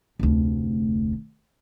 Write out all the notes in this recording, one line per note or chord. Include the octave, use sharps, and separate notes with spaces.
F1 D2